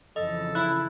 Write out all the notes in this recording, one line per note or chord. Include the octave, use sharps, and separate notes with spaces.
F2 C#3 E3 A4 D#5
E4 F#6